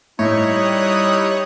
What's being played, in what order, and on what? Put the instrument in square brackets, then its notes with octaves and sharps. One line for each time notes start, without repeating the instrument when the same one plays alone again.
[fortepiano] A2 [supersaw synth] G3 D#6 F#6 [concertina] D#4 E4 [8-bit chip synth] C#5